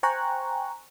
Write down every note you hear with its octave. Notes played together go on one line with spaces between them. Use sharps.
C5 G5 G#5 A#5 C#6 F#6